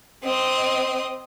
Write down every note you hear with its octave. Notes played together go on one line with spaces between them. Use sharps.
C4 D#5